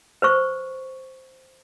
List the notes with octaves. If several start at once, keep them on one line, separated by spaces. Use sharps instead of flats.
B4 C5 C#6